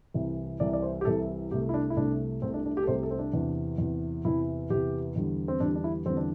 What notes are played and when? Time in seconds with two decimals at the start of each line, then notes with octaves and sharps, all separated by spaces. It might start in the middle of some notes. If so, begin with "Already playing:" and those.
0.14 C2 C3 E3
0.60 C2 C3 E3 D5
0.73 D5
0.82 C5
1.01 G4
1.05 C2 C3 E3 A4
1.51 C2 C3 A3 G4
1.69 E4
1.74 D4
1.90 E4
1.97 C2 C3 A3 D4
2.42 C2 C3 A3 C4
2.54 D4
2.66 D4
2.77 G4
2.83 A4
2.87 C2 C3 A3 C5
2.95 G4
3.03 A4
3.11 C4
3.19 D4
3.33 E2 C3 E3
3.78 E2 C3 E3
4.25 E2 C3 E3 E4
4.70 E2 C3 E3 G4
5.16 E2 D3 G3
5.48 C4
5.60 E2 D3 G3 D4
5.75 D4
5.84 E4
6.06 E2 D3 G3 C4
6.17 D4